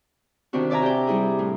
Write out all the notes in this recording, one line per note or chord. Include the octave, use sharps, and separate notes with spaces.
C3 D#3 C4 D4 E4 F#4
E4 D5 E5 G#5 A#5
G4 G5
G3 E4 G#4
A2